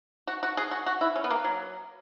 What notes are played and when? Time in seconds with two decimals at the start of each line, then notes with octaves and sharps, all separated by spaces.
0.27 F#4
0.43 F#4
0.57 G#4
0.71 F#4
0.86 F#4
1.01 E4
1.16 C#4
1.24 B3
1.30 A#3
1.44 F#3